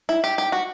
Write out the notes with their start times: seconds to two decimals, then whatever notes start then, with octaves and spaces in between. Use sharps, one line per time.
0.09 E4
0.24 G4
0.38 G4
0.52 F#4